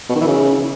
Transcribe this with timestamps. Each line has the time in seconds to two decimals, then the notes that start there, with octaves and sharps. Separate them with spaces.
0.09 B2
0.15 D#3
0.21 E3
0.27 C#3